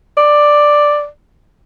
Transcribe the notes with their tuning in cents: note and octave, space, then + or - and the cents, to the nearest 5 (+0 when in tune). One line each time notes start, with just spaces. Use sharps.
D5 +5